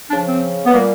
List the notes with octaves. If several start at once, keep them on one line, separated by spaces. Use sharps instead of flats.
C#3 F3 D4
C4
B3
A#2 G3 A#3